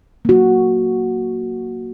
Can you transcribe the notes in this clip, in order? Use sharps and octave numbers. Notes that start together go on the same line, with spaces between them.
A#3 F#4